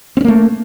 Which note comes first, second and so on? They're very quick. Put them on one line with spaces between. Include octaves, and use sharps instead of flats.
C4 C#4 A#3 A3